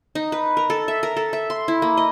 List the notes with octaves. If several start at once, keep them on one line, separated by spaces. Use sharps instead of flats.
D#4
B4
A#4
A4
E5
A#4
A4
E5
C6
E4
A#3
D#5